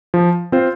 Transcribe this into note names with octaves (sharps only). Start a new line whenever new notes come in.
F3
C4 F4 C5